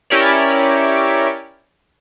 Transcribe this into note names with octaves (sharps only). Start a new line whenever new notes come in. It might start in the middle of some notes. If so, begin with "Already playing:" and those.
C#4 E4 G4 A#4 C#5 D5